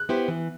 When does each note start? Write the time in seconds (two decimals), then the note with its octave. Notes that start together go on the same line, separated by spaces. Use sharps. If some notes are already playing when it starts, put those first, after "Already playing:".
Already playing: F#6
0.09 B3 E4 G4 C5
0.28 E3